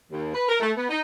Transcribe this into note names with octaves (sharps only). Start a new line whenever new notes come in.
D#2
B4
A#4
A3
B3
D#4